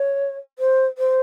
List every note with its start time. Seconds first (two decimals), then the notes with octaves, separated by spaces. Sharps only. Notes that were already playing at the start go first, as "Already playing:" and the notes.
Already playing: C#5
0.59 C5
0.98 C5